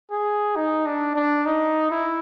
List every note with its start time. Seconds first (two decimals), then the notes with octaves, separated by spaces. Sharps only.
0.11 G#4
0.56 D#4
0.86 D4
1.15 D4
1.46 D#4
1.91 E4